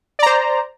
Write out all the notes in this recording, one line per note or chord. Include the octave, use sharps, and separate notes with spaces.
C5 D5 A#5